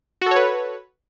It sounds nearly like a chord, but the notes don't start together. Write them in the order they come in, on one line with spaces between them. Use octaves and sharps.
F#4 A4 C#5 B4